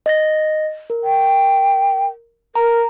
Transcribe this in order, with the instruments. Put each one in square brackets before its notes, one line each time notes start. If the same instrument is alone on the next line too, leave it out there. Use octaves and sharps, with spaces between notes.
[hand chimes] D#5 A6 A#6
A#4
[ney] G5
[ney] A#4 [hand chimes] A#5